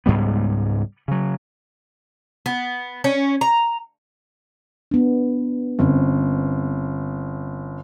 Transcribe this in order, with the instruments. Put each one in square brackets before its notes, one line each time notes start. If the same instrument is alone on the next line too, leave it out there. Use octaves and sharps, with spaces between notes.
[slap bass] C#2 G#2 G3 B3
C#3 F#3
[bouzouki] B3
C#4
A#5
[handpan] B3 D4
[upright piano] G1 [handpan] C4 C#4